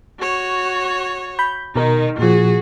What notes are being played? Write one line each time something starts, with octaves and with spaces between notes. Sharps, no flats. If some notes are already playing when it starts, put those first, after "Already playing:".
F#4 C#5
B5 G6
B2 D#3 D#4 A#4
A#2 F3 F#4 G#4